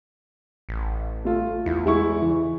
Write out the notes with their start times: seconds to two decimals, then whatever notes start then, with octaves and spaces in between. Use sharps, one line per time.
0.69 A1
1.25 A3 F4
1.66 E2 E4
1.86 G#3 E4 C#6
2.22 E3